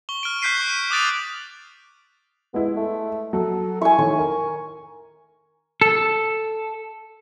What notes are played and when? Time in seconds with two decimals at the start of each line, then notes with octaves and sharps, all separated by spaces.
0.09 C#6 G7
0.23 F6 D7
0.42 C#6 F#6 G6 B6 C7 D#7
0.69 D#7
0.91 D6 D#6 F#6 A6 D7 F7
2.54 G#3 B3 E4
2.77 A3
3.33 F#3 A4
3.81 E4 G#5 C#6
3.99 A2 D#3 C#6
4.18 A#4 G#5
5.81 A4